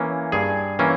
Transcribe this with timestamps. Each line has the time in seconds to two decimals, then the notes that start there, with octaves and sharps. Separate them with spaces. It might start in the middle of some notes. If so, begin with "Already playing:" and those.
Already playing: E3 A#3 C#4
0.32 G2 G#4
0.79 E3 A#3 C#4